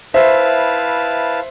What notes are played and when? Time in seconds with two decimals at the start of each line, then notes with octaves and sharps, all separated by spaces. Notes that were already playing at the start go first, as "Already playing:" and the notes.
0.14 E4 B4 C5 E5 F5 A5